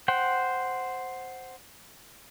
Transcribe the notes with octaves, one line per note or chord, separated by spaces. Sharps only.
C5 F#5 G5